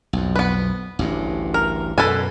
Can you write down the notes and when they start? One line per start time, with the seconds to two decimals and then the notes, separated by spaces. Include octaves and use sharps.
0.13 B1 F2
0.36 B3 B4
0.99 A1 D2 G2
1.54 A#4
1.98 F#2 B2 A4 B4 G#5